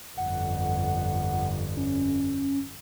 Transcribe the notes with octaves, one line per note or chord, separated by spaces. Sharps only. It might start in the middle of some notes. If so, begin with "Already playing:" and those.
G1 F2 F#5
C#4